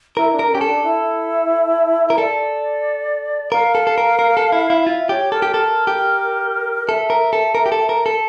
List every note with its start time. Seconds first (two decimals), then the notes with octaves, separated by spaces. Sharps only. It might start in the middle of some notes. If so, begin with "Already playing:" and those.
0.16 E4 A#4
0.33 D4
0.39 A#4
0.45 D4
0.50 C#4 G4
0.61 A4
0.67 D4
0.83 E4
2.10 A#4
2.18 A4 D5
3.52 A#4 F5
3.75 A4
3.87 A4
3.98 A#4
4.19 A#4
4.37 A4
4.52 E4
4.70 E4
4.80 F5
4.86 F4 E5
5.09 G4 C#5
5.32 A4 A#4
5.42 G4
5.54 A4 A#4
5.87 G4
6.89 A4 E5
7.10 A#4
7.33 A4
7.55 A#4
7.66 G4
7.72 A4
7.89 A#4
8.06 A4